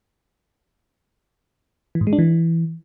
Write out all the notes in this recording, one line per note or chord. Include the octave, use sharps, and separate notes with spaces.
E3
G#2
G#3
D4
E3